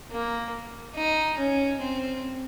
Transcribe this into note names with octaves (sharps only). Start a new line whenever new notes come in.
A#3
D#4
C#4
C4